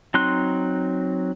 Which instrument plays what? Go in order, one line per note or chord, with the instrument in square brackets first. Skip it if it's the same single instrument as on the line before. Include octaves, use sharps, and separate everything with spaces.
[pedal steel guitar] F#3 C4 D#4 C6 F#6